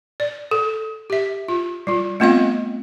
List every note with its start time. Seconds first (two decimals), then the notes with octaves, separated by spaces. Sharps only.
0.20 D5
0.51 A4
1.10 G4 E5
1.48 F4
1.87 G3 F4
2.20 A3 B3 C4 F4 D#5 F5